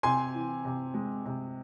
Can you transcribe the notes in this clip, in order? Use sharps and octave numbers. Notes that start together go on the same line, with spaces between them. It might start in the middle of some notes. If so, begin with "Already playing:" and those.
C3 G#5 C6
E3
C3
G#3
C3